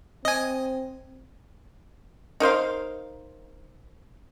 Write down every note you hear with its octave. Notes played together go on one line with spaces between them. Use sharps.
C4 D#5 G#5
D#4 A#4 C5 F5